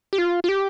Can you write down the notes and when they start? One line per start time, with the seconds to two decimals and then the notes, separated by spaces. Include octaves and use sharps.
0.13 G4
0.18 F4
0.44 F4
0.49 G4